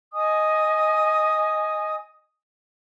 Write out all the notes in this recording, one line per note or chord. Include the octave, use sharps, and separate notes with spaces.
D#5 G#5 D#6